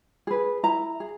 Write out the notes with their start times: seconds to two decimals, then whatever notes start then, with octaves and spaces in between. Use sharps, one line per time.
0.27 G#4 B4
0.63 E4 A#5
1.00 G#4